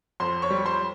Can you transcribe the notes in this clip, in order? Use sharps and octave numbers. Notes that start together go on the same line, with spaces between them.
F2 C5 C6
C#5 C#6
G3
C5 C6